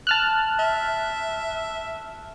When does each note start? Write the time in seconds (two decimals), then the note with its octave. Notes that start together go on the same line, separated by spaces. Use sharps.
0.07 A5 F6 F#6
0.59 E5